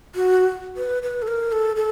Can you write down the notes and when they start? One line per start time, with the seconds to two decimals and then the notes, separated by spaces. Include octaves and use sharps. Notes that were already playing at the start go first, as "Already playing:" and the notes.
0.15 F#4
0.77 B4
1.03 B4
1.22 A4
1.28 A#4
1.52 A4
1.76 A4